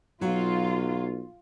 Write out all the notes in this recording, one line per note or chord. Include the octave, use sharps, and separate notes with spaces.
B1 F#3 F4